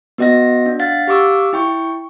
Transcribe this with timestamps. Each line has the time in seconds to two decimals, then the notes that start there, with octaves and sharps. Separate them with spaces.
0.18 B3 F#4 D#5 F#5 A#6
0.66 D4
0.80 F5 F#5 A6
1.07 G4 F5 C#6 D6 E6
1.53 E4 G5 C#6